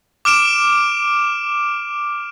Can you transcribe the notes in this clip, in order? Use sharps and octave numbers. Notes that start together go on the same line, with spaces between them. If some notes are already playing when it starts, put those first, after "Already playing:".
D6 F6 D7 E7